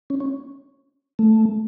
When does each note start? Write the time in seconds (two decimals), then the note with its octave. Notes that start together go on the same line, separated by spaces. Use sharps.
0.10 C#4
0.20 C#4
1.19 A3